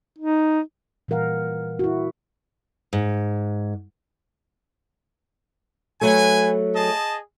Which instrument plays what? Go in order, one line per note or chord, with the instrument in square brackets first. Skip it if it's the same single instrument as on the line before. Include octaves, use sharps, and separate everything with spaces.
[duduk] D#4
[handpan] A#2 E3 G3 A#4 F5 F#5
E4 F#4
[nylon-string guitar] G#2
[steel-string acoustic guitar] F#3 A3 [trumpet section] B4 G#5
[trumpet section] G#4 D#5 A5